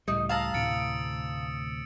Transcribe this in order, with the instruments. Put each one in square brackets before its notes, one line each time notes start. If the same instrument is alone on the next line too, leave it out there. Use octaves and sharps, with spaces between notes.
[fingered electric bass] C#2 A2 G3 [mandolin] D#4
[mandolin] F5 A5 A#5 [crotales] D#6 E6 E7
[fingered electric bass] D2 A2 C3 [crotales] A6 C#7 D7
[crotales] D7